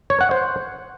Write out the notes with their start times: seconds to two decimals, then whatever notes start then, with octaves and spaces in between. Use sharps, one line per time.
0.10 C#5
0.21 F#5
0.31 C5